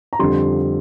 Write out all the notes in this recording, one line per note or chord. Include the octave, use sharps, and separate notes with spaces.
A#5
F2 D3 G3 C6